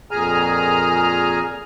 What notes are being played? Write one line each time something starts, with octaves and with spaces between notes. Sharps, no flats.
F2 A#2 G#4 G#5 A#5 F6